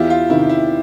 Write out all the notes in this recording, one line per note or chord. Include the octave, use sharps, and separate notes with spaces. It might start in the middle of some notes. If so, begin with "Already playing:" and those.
Already playing: E2 E4 F4 G4
F4
C3 D#3 E4
E4